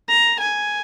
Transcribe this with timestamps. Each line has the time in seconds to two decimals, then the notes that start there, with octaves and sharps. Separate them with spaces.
0.09 A#5
0.40 G#5